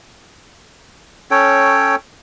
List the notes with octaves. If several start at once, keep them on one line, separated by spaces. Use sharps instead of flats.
C#4 A4 C#5 G5